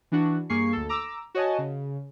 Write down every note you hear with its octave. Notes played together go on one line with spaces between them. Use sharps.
E3 D4 F#4
G2 A#3 G#4 C#6 C7
D2 A4
A#5 D6 E6
F#4 C#5 D#5 G#5 A5
C#3